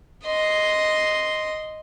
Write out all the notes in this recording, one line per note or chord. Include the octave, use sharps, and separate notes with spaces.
D#5 C6